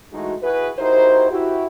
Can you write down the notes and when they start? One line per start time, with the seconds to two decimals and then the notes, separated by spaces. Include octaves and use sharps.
0.12 E3 G#3 A3 D#4 F#4
0.42 E4 F#4 G#4 B4
0.78 D#4 E4 F#4 G4 A#4 C5
1.30 E4 F#4 G4